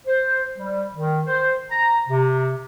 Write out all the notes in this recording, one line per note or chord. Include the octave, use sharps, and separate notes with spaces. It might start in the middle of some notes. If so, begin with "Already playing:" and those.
C5
G3
D#3
C5
A#5
C3